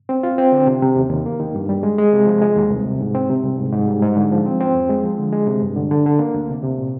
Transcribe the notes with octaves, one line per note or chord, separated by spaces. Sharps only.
C4
F4
C4
D3
C3
C3
D#2
D#2
A#3
D#3
G2
G3
G#3
G#3
C3
F3
G#3
D#2
C2
C3
G#2
C4
C3
C2
G#2
G#2
G3
G#2
D3
F3
C4
C4
F2
G#3
F3
D3
G#3
C3
G2
D3
D3
D3
A#3
D2
C3
C3
A#2